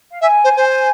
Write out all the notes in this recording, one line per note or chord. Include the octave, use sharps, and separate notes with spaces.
F5
E5 G#5
C5
C5
G#5